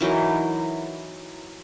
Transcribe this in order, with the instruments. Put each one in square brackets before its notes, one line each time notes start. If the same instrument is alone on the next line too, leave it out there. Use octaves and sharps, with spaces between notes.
[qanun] E3 F#3 D#4 A#4